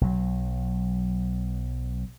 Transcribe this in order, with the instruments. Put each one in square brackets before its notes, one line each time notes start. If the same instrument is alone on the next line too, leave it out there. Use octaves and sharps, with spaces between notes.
[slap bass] B1 F#3